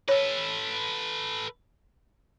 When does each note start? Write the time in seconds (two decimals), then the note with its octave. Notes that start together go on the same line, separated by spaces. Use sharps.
0.08 A4 B4 C#5